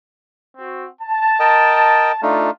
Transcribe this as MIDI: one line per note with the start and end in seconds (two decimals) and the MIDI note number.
0.58 0.86 60
0.58 0.86 66
1.02 2.17 81
1.40 2.12 70
1.40 2.12 75
1.40 2.12 79
2.23 2.50 57
2.23 2.50 62
2.23 2.50 63
2.23 2.49 65